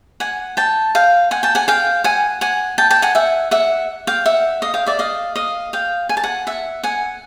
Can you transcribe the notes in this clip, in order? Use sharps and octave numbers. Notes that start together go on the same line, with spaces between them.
F#5 G#5
G5 A5
F5 G5
F#5 G#5
G5 A5
F#5 G#5
F5 G5
F#5 G#5
F#5 G#5
G5 A5
G5 A5
F#5 G#5
E5 F#5
E5 F#5
F5 G5
E5 F#5
D#5 F5
F5 G5
D5 E5
D#5 F5
D#5 F5
F5 G5
G#5
A5
F#5 G#5
E5 F#5
F#5 G#5